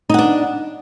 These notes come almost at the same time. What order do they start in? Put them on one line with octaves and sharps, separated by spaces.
D#4 F#5 D4